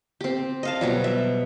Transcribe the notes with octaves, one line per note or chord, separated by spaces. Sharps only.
C4 G4
D#5 F5 A5
B2 F#3 G3
E5